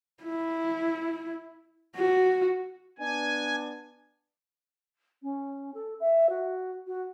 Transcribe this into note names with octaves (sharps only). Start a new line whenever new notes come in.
E4
F#4
B3 D4 G#5
C#4
A4
E5
F#4
F#4